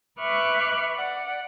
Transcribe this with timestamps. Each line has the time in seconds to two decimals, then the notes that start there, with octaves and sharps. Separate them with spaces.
0.19 B4 E5 C#6 D6 F6 F#6
0.96 D5 F#5